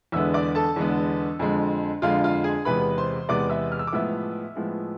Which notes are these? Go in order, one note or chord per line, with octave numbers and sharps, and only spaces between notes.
E2 D3 G#3 B3 E5 E6
D5 D6
A4 A5
E2 D3 G#3 B3
F2 D3 G#3
F2 D3 G#3 F4 F5
F4 F5
G#4 G#5
E2 C3 G#3 B3 B4 B5
C5 C6
E2 C3 G#3 B3 D5 D6
E5 E6
F6
E6
D6
A2 F3 G#3 B3 E5 E6
A2 F3 G#3 B3